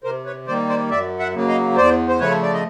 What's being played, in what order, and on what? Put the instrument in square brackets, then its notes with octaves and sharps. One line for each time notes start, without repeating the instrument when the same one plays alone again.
[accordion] C3 A#4 C5
B4 C#5
D#3 G3 A#3 C5 D5
C5 D5
F#2 D5 E5
E5 F#5
C#3 F#3 A#3
D#5 F5
E2 C5 D5
C5
C#3 F3 A3 B4 C#5
D5
D#5